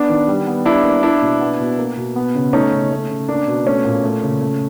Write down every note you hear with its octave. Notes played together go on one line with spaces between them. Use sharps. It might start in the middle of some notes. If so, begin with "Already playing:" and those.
Already playing: B3 D4
D#3
G3
B3
G3 D4 E4
A#3
A#3 D4 E4
B2
B3
B2
A#3
B2
B3
C#3
A3 C#4 D#4
C#3
A3
C#3
A#3 D4
B2
A3 C#4
A#2
A3
C#3
A3